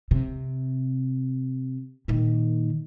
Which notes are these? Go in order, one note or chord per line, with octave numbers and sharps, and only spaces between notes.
C3
A#2 D#3